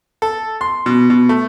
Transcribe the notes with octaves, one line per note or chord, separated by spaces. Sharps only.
A4
C6
B2
B2
A3